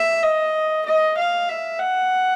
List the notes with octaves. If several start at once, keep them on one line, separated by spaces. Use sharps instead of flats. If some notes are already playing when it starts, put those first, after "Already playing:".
Already playing: E5
D#5
D#5
F5
E5
F#5